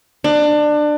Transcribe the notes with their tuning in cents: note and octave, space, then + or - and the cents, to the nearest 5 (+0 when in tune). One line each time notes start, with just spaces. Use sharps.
D4 +25